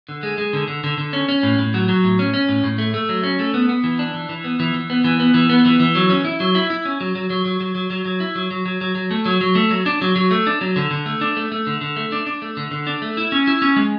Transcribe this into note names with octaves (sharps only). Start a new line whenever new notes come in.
D3
G#3
G#3
D3
D3
D3
D3
C#4
C#4
A2
A2
F#3
F#3
A2
C#4
C#4
A2
A2
A3
A3
F#3
C#4
A3
B3
B3
E3
D4
E3
E3
B3
E3
E3
B3
E3
B3
E3
B3
E3
E3
F#3
C#4
E4
F#3
E4
E4
C#4
F#3
F#3
F#3
F#3
F#3
F#3
F#3
F#3
E4
F#3
F#3
F#3
F#3
F#3
A3
F#3
F#3
A3
F#3
D4
F#3
F#3
A3
D4
F#3
D3
D3
A3
D4
A3
A3
D3
D3
A3
D4
D4
A3
D3
D3
D4
A3
E4
C#4
E4
C#4
G#3